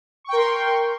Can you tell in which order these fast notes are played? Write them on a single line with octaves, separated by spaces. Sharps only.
C#6 G5 A#4 C6